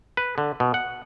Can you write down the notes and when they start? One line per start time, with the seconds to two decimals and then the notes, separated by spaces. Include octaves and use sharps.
0.17 B4
0.38 D3
0.60 B2
0.74 F#5